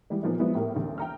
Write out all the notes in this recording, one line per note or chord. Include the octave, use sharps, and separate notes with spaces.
E3 G3 G#3
A#2 F3 A#3 B3 D#4
F3 F#3 G#3 B3 C4 E4
A2 G4 A#4
A1 D2
G5 A#5 F6